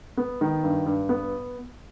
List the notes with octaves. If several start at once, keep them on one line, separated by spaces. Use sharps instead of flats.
B3
D#3
G2
G2
B3